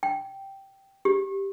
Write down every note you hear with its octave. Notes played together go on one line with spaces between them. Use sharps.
G5
G4